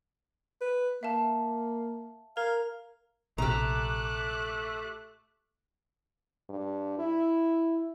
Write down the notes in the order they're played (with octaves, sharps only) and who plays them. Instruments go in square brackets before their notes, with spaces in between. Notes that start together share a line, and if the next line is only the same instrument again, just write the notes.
[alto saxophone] B4
[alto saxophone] A#3 [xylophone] E5 F5 A5
[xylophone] A#4 A#5 G#6 [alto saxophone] F5
[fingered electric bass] A#1 C3 [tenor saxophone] A3 [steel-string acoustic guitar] G4 A#5 [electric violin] D6 F#6
[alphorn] G2
E4